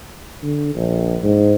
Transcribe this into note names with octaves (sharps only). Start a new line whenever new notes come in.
D3
A#1
G#2